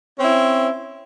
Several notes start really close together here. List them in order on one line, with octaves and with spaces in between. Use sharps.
C#4 C4 E4